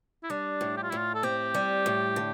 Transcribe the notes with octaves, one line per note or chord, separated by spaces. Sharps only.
E4
G3 D4
A2
G4
F4
A2 E4
F4
A4
C4 G4
G3
A2
D3